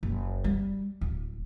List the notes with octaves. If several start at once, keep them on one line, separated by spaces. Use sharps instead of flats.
F#1
G3
D1